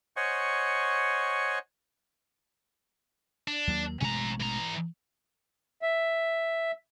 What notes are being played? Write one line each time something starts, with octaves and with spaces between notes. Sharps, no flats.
C5 C#5 D#5 F#5 G#5 C#6
D4
D#2 F#3 A#3
A1 B2 G#3 C#4 A#5
E3 A#5
E5